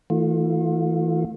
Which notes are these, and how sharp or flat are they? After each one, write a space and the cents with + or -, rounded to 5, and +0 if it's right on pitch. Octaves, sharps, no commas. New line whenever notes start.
E3 -20 A3 +20 F4 +35